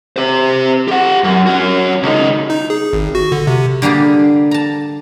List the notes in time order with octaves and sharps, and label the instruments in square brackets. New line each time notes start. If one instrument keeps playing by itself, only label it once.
[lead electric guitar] G4 C5
G4 F#5
F#2
C#4 F#4
C#2 D#4
[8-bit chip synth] D#4
G#4
G#1
F#4
D3
C3
[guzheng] D3 G3 A#3 G4 G#4
A5 A#5